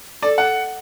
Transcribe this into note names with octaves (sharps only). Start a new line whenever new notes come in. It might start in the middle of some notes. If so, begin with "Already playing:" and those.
A4 D5
F#5